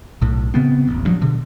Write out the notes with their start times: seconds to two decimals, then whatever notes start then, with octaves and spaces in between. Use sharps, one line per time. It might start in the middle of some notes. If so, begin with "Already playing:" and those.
0.22 B1 A2
0.54 C#3 B3 C4
0.87 D#1 A1
1.05 G2 F3 F#3
1.21 B2 D3